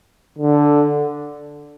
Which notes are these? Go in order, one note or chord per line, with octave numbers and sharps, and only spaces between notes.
D3